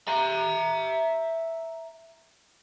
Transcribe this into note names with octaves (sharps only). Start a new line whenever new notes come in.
E5 A#5